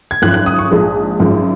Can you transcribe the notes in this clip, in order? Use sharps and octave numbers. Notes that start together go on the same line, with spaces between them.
G#6
G#1 F#2 F3 F#6
F#6
D#6
C#6
A#1 G#2 F3 G#3
G#1 F#2 F3 G#3